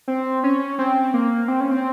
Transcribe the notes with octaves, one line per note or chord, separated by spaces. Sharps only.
C4
C#4
C4
A#3
C4
C#4
C4